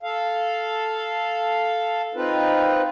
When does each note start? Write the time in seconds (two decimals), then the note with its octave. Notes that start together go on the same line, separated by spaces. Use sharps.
0.03 A4 F5
2.14 C4 D#4 F4 B4